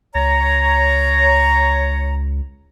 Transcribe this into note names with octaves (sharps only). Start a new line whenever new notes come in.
C#2 C#5 A#5